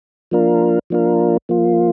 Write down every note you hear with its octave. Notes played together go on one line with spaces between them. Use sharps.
F3 A#3 D4 F4 A#4
F3 A#3 D4 F4 A#4
F3 A#3 F4